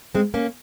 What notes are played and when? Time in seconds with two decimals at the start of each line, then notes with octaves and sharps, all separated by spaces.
0.15 G#3 C4
0.34 A#3 C#4